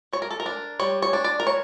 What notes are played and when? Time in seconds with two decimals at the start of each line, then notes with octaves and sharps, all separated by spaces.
0.13 G3 C#5
0.22 A#4
0.31 A4
0.40 A#4
0.46 D4
0.80 G3 C#5
1.02 C#5
1.13 D4
1.24 D5
1.40 A#4
1.47 E3 C#5